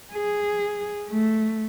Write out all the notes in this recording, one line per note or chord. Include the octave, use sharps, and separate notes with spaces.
G#4
A3